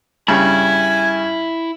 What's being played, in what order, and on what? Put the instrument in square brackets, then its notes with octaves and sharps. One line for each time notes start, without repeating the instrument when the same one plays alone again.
[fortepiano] G2 C#3 [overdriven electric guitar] E4 [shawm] G#5